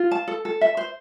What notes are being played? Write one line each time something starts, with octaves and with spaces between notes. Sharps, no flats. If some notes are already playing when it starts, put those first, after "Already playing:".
Already playing: F4
A5
A4
A4
E5
C5